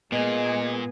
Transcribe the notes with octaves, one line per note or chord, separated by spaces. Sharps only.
A#2 G#3 A#3 B3 G#4 D#5